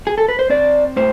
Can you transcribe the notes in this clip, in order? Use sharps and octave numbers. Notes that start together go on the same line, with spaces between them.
G#4
A4
B4
C5
C4 D5
A2 C5